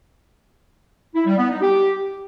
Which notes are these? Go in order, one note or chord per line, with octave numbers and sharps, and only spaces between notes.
E4
G3
B3
D#4
G4